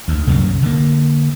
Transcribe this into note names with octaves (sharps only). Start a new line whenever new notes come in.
D2
C2 F#2 A#2 C#3
D3 A#3